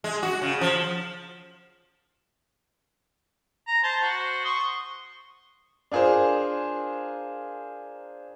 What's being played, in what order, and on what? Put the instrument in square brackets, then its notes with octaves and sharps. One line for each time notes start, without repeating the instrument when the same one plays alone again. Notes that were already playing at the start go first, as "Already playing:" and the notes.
[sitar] G#3
F#4
C#3
F3
[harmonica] A#5
C5 A5 C6
F#4 C5
C6 C#6 D#6
[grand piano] D4 F4 G#4 A#4 C5